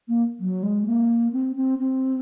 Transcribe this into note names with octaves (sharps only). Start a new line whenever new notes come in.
A#3
F#3
G#3
A#3
C4
C4
C4